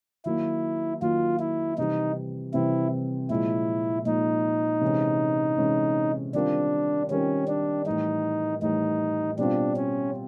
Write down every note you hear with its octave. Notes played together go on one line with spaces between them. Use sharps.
D#3 F#3 A#3 E4
D#3 F#3 A#3 F4
E4
C3 E3 G3 C4 D#4
C3 E3 G3 C4 E4
A#2 F3 G#3 E4
A#2 F3 G#3 D#4
C3 E3 G#3 C#4
C3 E3 G#3 C#4
D#3 G3 C4 D4 F4 A#4
D#3 G3 C4 C#4 F4 A#4
D4
A2 E3 G3 D#4
A2 E3 G3 D#4
B2 G3 C4 D4 F4
C#4